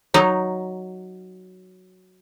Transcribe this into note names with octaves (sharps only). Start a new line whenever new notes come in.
F#3 D#4